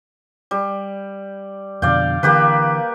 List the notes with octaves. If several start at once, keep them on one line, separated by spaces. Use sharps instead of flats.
G3
F2 B2 D3 D5 F5 G5
D3 E3 A#3 G4 B4